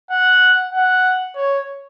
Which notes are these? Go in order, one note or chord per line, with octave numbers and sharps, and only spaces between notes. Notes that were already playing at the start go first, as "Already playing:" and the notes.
F#5
F#5
C#5